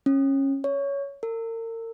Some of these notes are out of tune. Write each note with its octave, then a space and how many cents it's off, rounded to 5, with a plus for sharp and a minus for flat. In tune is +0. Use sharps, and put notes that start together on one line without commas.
C#4 -20
C#5 +10
A#4 -40